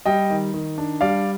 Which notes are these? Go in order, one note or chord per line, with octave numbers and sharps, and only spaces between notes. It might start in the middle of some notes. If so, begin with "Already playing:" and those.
G3 D#5 G5
D#3
D#3
D4
G3 D5 F5